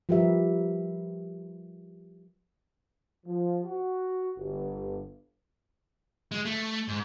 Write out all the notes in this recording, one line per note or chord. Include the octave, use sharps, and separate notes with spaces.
F3 G3 G4 A#4 B4 E5
F3
F#4
G1
G#3
A3
G#2